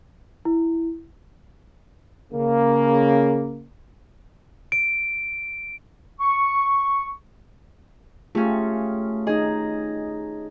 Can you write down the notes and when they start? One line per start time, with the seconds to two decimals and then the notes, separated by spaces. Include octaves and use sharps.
0.45 E4
2.33 C#3 A#3
4.72 D7
6.21 C#6
8.35 A3 C#4 F4 G4 G#4
9.27 D#4 G#4 D#5